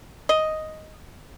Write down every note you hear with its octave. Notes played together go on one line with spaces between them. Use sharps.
D#5